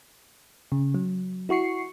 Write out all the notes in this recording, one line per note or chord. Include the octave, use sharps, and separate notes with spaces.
C#3
F#3
E4 F#4 C#6 C7 C#7